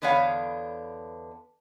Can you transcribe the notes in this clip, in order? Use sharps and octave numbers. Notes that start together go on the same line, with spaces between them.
E2 D3 B3 D4 C#5 F5